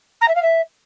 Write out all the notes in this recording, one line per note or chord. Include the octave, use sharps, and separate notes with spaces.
A#5
E5
F5
E5